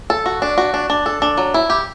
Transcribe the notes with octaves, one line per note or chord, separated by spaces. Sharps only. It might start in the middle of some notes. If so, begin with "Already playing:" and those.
A4
F#4
D4
F#4
D4
D4
A4
D4
F#3
E4
G4